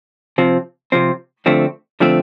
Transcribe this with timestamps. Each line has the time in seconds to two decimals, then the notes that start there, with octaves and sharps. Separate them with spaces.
0.38 C3 F3 C4
0.92 C3 F3 C4
1.46 D3 F3 A3 C4
2.00 D3 F3 A3 C4